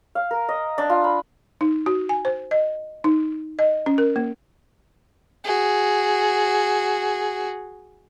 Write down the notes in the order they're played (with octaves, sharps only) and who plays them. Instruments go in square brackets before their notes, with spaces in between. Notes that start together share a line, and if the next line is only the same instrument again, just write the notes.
[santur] F5
A#4
D#5
D4
F4
B5
[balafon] D#4
F#4
G#5
C5
D#5
D#4
D#5
C#4
A#4
A#3
[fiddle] F#4 G#4